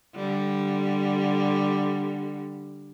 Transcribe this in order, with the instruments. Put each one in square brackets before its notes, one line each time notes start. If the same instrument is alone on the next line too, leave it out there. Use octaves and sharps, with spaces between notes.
[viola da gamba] D3 G3